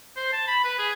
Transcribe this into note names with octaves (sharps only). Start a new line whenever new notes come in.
C5
A5
B5
B4
G#4